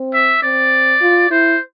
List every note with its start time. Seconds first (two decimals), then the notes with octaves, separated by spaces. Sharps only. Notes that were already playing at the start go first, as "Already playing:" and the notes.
Already playing: C4
0.13 E5
0.43 C4 D5
1.01 F4
1.30 E4 C5